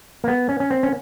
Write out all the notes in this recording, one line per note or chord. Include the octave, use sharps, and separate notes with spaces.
A#3
B3
C#4
C#4
C4
C#4